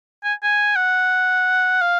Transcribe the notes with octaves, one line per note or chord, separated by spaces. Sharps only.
G#5
G#5
F#5
F5